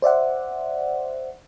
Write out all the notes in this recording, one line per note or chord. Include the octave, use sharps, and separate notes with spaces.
C5 D5 E5 F#5